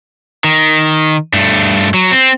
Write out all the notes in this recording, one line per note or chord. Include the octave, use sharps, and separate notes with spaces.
D#3
G2 A3
F#3
C4